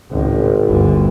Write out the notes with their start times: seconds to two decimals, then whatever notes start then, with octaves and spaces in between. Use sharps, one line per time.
0.10 G#1 C#2 A2
0.66 G1 D2 D3